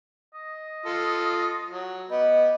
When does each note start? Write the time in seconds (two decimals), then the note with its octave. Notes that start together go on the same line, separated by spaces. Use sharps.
0.35 D#5
0.86 F4 A4
1.70 F#3
2.10 B3 G4 D#5